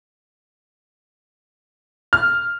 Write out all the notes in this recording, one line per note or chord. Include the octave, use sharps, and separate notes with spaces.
F6